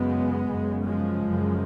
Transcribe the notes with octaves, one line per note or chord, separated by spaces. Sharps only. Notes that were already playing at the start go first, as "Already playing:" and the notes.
Already playing: F#2 C#3 G#3 B3
F#2 C#3
F3 G#3
F#2 C#3